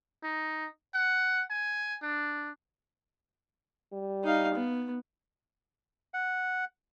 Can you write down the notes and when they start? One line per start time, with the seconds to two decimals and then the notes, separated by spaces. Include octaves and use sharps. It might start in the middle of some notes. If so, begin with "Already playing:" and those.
0.23 D#4
0.94 F#5
1.50 G#5
2.02 D4
3.93 G3
4.24 D#4 F5
4.54 B3
6.14 F#5